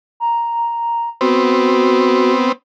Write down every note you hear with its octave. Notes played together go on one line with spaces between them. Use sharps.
A#5
B3 C4 F#4